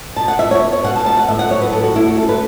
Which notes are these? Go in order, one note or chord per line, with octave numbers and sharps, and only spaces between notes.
B2 A5
F#5
B3 E5
C#5
B3
C#5
B2 F#5
A5
B3 A5
F#5
A2 E5
F#5
F#3 C#5
B4
A2 A4
F#4
A3 E4
F#4
C#4 A4
B4